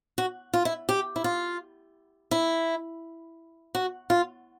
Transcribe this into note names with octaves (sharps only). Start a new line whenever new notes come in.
F#4
F4
E4
G4
E4
F4
E4
F#4
F4